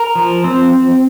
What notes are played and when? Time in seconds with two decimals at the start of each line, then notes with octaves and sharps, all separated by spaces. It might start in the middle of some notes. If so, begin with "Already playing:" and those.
Already playing: A#4
0.15 F3
0.44 C4